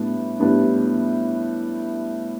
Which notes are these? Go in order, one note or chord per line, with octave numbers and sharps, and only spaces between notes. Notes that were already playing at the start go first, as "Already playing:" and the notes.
Already playing: A2 G3 B3 D4
A2 G3 B3 D4